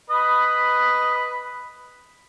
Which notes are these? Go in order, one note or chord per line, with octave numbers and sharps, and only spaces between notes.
B4 D#5 B5